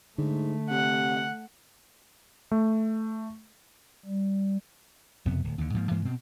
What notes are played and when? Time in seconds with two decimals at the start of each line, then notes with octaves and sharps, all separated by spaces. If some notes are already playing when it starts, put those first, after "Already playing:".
0.18 G#2 D3 A3
0.70 C3 F#5
2.51 A3
4.05 G3
5.25 F#1 F2 C3 B3
5.44 D1
5.58 D#2 D3
5.74 G#2 F3 G3 A#3
5.91 G2 E3 G#3 A#3
6.05 B2 C4